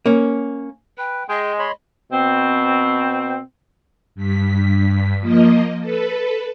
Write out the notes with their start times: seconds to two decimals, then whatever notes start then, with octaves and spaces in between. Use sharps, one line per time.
0.06 A#3 C#4
0.98 B4 G5
1.29 G#3 G#4 D#5 G5
1.59 C#5 B5 C6
2.12 B2 C4
4.15 G2 B6
5.21 F3 A#3 D#5
5.81 A4 B4